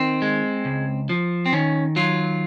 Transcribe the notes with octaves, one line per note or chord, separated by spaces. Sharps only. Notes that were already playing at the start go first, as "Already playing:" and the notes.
Already playing: D#3 C4
G#3
C#2
F3
C4
D#3 C#4
F#3 F4